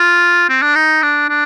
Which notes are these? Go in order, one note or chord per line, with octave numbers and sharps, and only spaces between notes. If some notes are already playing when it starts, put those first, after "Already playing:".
Already playing: F4
C4
D4
D#4
D4
D4